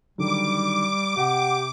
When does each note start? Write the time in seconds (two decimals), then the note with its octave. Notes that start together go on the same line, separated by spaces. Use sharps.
0.18 D3 D#3 F#3 G3 D6
1.17 C3 G4 F#5